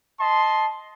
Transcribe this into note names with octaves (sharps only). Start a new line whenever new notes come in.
D#5 A5 C6